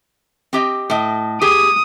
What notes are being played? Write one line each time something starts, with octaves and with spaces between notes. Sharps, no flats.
C4 G4 D#5
A2 D#5
G4 G#4 D#6